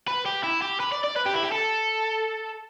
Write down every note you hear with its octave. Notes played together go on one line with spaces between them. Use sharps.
B4
G4
E4
G4
B4
D5
D5
B4
G4
E4
G4
A4